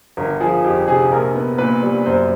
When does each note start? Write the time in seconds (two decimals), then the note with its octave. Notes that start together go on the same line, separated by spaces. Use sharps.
0.17 G1 A#4
0.40 F3 G#4
0.64 F2 G4
0.88 C3 G#4
1.11 A#1 A#4
1.35 B3
1.58 A#2 B4
1.82 G3
2.06 F#2 C5